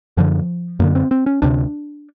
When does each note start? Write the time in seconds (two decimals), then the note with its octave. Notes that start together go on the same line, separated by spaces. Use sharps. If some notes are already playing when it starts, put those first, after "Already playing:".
0.17 F#2 D3 F3
0.80 F#2 D3 A#3
0.95 C4
1.11 C4
1.26 C#4
1.42 D2 C3 D4